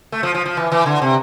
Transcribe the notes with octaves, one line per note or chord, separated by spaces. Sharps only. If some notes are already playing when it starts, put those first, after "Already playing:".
A3
F3
F3
F3
E3
E3
D3
C3